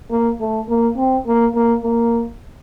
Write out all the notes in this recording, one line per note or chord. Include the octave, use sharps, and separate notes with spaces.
A#3
A3
A#3
C4
A#3
A#3
A#3